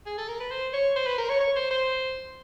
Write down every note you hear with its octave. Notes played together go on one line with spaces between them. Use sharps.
G#4
A4
A#4
B4
C5
C#5
C5
B4
A#4
C#5
C#5
C5
C5